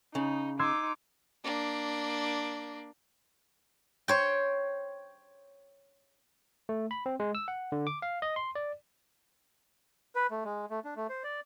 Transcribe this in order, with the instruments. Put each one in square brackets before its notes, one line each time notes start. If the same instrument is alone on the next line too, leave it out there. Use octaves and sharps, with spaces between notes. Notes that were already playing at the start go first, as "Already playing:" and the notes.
[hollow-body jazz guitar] C#3 [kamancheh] D#4
[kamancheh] D#4 D6 [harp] C6 E6 G#6
[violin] A#3 D4
[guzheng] C5 C#5 G5
[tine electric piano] A3
B5
C4
G#3
E6
F#5
D3
D6
F5
D#5
C6
D5
[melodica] B4
A3
G#3
A3
D4
A3
C5
D5